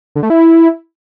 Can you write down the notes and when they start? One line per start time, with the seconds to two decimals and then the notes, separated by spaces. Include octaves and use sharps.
0.16 D3
0.23 A3
0.30 E4